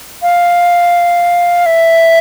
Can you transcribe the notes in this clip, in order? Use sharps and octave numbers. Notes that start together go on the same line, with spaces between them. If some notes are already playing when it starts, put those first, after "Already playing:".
F5
E5